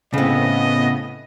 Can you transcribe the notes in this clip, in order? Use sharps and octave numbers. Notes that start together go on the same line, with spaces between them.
A2 C#3 B3 C4 D#5